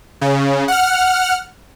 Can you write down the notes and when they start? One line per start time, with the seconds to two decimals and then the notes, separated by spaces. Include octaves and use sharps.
0.21 C#3
0.68 F#5 F6